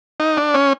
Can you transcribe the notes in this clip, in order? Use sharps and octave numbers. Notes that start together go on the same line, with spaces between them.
D#4
D4
C#4